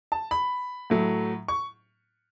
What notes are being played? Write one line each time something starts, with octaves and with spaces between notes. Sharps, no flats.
A5
B5
A2 F#3 A3
C#6